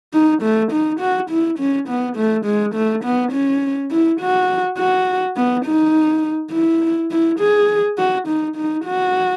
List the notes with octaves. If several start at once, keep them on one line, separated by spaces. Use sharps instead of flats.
D#4
A3
D#4
F#4
E4
C#4
B3
A3
G#3
A3
B3
C#4
E4
F#4
F#4
B3
D#4
E4
E4
G#4
F#4
D#4
D#4
F#4